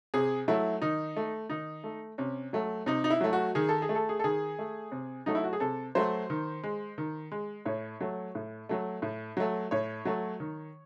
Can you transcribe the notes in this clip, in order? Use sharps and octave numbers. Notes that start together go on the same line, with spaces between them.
C3 G#4
F#3 A3 E4
D#3 D#4
A3
D#3 D#4
A3
C3 C#4
F#3 A3
C3 D#4
D#4
E4
F#3 A3
F#4
D#3 G#4
A4
G#4
A3
A4
G#4
A4
D#3 G#4
A3
C3
F#3 A3 D#4
E4
F#4
G#4
C3 A4
F#3 A3 C5
D#3
G#3
D#3
G#3
A2 C#5
F#3 A3
A2
F#3 A3
A2
F#3 A3
A2 C#5
F#3 A3
D#3